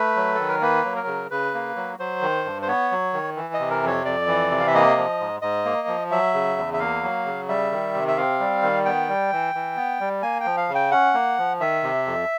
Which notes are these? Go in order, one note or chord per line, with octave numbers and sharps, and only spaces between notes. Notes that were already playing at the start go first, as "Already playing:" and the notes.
Already playing: A3 B4
F#3
D#3 A4
A#4
A#3 B4
F#3
A#4
C#3
C#3 B4
A#3
F#3
F#3 C5
D#3
G2
C5
B3 C#5
F#3
D#3
E3
D#5
C3
A#4
F2 C#5
F2 D5
E3
C3
F5
E5
A#3 D#5
F3
G#2
G#2 D#5
A#3
F3
F#3 E5
C#3
E2
E5
A#3 F5
F#3
C#3
G3 E5
D#3
C3
E5
C4 F5
G3
D#3
B3 G5
G3
E3
E3
B3
G3
A#3 G#5
G5
F3
F5
C#3
G5
C#4 F#5
A#3
F3
D#3 E5
C3
F2